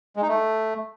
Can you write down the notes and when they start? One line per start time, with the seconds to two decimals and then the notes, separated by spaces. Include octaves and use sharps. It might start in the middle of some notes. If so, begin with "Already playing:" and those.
0.16 G#3
0.22 D#4
0.28 A3